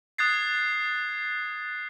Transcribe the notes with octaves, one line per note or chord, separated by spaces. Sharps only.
D#6 F#6 G#6 A6 C7